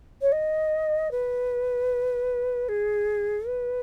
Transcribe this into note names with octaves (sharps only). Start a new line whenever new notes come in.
C#5
D#5
B4
G#4
B4